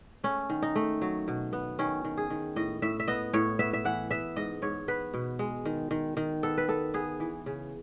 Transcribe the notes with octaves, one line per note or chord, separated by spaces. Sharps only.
A3 C#4
D#3
D#4
A3
F#3
B2
B3
D#3 C#4
D#3
G#4
D#3
A2 D#5
A2 E5
E5
B3 D#5
A2 C#5
B3 E5
E5
E3 F#5
B3 E5
G#2 D#5
G#2 C#5
B3 B4
B2
G#3
D#3
D#3
D#3
B3 A4
B4
B3 A4
B3 G#4
E3
C#3